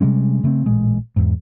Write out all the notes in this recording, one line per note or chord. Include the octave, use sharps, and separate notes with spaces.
C3 G3 G#3 C#4
C#3 A3 B3 C4
A1 A#2 G#3
E2 G#2